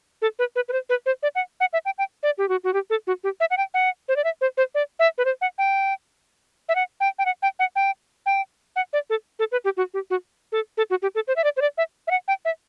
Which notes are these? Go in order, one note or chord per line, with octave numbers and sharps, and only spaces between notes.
A4
B4
B4
B4
C5
B4
C5
D5
F#5
F#5
E5
G5
G5
D5
G4
F#4
F#4
G4
A4
F#4
G4
E5
F#5
G5
F#5
C5
D5
E5
C5
C5
D5
E5
B4
C5
F#5
G5
E5
F#5
G5
G5
F#5
G5
F#5
G5
G5
F#5
D5
A4
A4
B4
G4
F#4
G4
F#4
A4
A4
F#4
G4
A4
C5
E5
D5
C5
D5
E5
E5
F#5
G5
E5